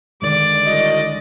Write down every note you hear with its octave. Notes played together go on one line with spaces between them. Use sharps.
D3 D#3 G#3 D5
C2 F#4 D#5